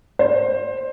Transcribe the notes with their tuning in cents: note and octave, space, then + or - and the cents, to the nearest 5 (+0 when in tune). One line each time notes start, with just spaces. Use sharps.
C5 +15